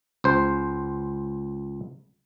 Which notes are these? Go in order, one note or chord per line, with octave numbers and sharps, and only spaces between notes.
C#2 C5